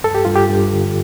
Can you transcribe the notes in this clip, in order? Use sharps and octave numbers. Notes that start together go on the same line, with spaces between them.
G2 A4
G4
G2 F4
G4
G2
D3